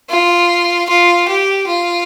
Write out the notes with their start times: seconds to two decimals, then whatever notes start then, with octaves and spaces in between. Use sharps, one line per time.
0.10 F4
0.89 F4
1.28 G4
1.67 F4